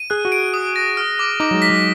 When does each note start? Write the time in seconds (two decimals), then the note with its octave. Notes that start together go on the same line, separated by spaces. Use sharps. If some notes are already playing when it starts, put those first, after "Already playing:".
Already playing: D#7
0.10 G#4 F#6
0.25 F#4
0.32 D7
0.54 D#6
0.76 A#6
0.97 F6
1.19 D6
1.40 D#4 D6
1.51 F#3
1.54 G#3
1.62 B6
1.70 F#3